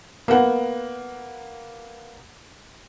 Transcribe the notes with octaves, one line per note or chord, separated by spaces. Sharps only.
A#3 B3 F#5